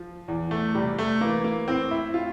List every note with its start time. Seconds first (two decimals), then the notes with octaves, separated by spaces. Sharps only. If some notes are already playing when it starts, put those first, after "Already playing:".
Already playing: F3
0.28 E2
0.51 A3
0.75 C3 G3
0.98 A3
1.21 E3 A#3
1.44 A#3
1.68 A2 C4
1.91 E4
2.14 A2 F4